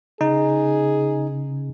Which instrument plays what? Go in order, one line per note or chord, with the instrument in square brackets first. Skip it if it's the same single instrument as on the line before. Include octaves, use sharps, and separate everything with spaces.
[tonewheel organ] C#3 [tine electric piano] D#4 [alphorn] G#4